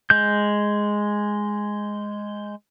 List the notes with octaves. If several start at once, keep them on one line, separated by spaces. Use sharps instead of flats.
G#3 G6